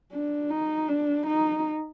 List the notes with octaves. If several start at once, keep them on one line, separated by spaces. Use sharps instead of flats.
D4
D#4
D4
D#4